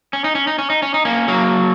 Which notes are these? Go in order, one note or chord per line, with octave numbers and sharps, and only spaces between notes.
C#4
D#4
C#4
D#4
C#4
D#4
C#4
D#4
A#3 C#4
F#3 A#3